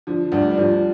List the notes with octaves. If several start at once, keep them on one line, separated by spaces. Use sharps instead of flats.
D3 F3
D2 G3
G3
D2 F3